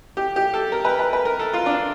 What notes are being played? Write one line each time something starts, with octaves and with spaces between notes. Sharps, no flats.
G4
G4
A4
A#4
B4
B4
B4
A#4
A4
F4
D4